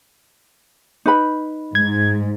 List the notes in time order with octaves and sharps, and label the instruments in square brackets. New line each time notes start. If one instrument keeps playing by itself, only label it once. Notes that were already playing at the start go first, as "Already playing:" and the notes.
[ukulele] D#4 B4 B5
[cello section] G#2 [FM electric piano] G#6